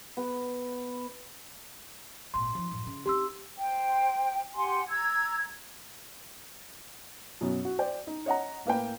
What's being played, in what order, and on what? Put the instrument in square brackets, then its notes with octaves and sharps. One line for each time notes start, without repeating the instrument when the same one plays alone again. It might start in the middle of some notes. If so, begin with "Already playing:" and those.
[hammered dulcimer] B3
[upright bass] G#1 A#2 [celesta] C6
[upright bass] F3 D#4
F#2 A2
C#3
[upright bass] C4 D#4 [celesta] G4 C6 E6
[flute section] C5 G5
G4 F#5 G#5 C6
A#5 E6 G#6
[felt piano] F#2 B2 F#3
F#4
C5 D5 G5
D#4
C#5 D#5 F#5 A#5
A2 A#3 B4 G5